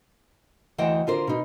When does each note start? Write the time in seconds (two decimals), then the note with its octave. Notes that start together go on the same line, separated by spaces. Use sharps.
0.78 D2 E3 C5 D#5 F#5 G5
1.07 D3 F4 A#4 C5
1.27 B2 D#4